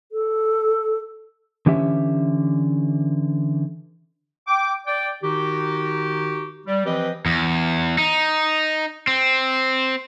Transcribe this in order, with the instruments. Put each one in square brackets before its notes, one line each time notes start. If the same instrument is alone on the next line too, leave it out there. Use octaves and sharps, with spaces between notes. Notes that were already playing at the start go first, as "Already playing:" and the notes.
[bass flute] A4
[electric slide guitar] D3 E3 C#4 G4 E5
[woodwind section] G5 D6
D5 G5
D#3 D#4 F#4 G4
G3
E3 F3 C4 G4 B4 D#5
[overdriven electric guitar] E2
D#4
C4